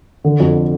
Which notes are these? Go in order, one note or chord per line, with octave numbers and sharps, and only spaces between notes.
D3
F2